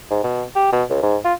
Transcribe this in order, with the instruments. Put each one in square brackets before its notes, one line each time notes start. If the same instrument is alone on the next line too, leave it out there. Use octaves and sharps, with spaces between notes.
[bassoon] G#2
B2
G4
B2
C#2
G#2
F4